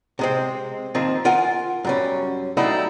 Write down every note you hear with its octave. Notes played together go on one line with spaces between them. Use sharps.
C3 G#3 C4
D#3 F3 A#3 C4
F4 A#4 F#5 G#5
F#2 G3 C#4
F#3 G3 A3 D#4 E4